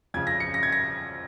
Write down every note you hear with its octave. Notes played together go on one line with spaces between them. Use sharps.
F2 C#3 G#6
A#6
C#7
A#6
G#6
A#6